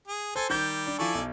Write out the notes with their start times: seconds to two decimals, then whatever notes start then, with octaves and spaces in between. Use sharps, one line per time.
0.08 G#4
0.36 A4 C5 G#5
0.50 D#3 G3 G4 G6
0.87 D4
0.99 F3 E4 A4 D5 G#5 C#6
1.15 B1